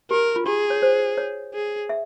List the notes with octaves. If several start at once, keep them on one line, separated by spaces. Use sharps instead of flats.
G4 A#4
F4
G4 G#4
C#5
C5
C#5
G#4
E5